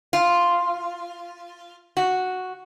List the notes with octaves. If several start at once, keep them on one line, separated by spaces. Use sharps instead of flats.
F4
F#4